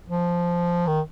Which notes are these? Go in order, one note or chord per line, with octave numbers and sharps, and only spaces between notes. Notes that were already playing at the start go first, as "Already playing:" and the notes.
F3
D#3